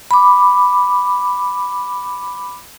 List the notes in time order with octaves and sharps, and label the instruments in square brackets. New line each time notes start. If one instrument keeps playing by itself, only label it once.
[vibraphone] B5 D6